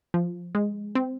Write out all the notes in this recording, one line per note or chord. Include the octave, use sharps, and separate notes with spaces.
F3
G#3
C4